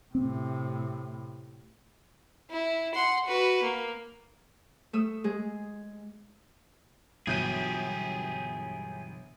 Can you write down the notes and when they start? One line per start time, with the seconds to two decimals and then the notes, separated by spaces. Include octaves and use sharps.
0.15 A2 C3 C4
2.50 E4
2.94 F#5 C6
3.25 F#4 B4
3.63 A#3
4.93 A3 D#6 E6
5.24 G#3 G#4
7.27 G1 B2 E3 F#3 G4 G#4 G6 D#7